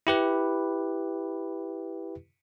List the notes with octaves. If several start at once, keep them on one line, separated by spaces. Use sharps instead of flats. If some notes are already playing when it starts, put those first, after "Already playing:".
E4 G4 B4